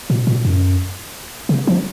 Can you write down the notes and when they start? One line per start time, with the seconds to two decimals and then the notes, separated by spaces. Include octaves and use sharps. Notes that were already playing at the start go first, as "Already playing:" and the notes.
0.10 A#2
0.27 A#2
0.45 F#2
1.49 C#3
1.67 F3